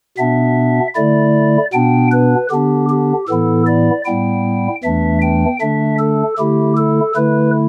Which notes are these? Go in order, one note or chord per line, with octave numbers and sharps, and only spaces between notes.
B2 B3 D4 E5
D3 A3 E4 D5
B2 B3 D4 G5
B4
D3 B3 D4 G4
G4
A2 E3 B3 E4 A4
D5
A2 G3 B3 E4 G5
E2 E3 A3 D4 E5
G5
D3 A3 D4 E5
A4
D3 A3 E4 G4
A4
D3 A3 E4 B4